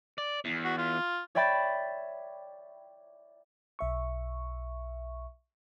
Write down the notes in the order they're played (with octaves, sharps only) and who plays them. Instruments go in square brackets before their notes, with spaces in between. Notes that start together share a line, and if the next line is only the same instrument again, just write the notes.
[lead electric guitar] D5
E2
[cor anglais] F#4
F4
[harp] C#5 D5 E5 G5 B5 A6
[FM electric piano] B1 E5 C#6